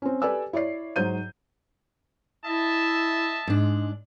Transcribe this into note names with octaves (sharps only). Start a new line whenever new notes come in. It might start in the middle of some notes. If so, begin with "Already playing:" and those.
C4 C#4
G4 A4 B4 D5 G#5 E6
E4 C#5 D5 C7
G#2 F#3 C5 G6 D#7
E4 D#5 E5 A5
G#2 G#3 D4